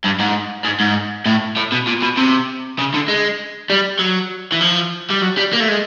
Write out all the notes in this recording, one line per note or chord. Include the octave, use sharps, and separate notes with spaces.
G2
G#2
G#2
G#2
A2
A2
B2
A#2
B2
C3
C#3
D3
G#3
G3
F#3
E3
F3
G3
F#3
G3
A#3
A3
G#3